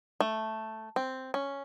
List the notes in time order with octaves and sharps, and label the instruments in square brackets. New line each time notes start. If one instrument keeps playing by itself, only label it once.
[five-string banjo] A3
C4
C#4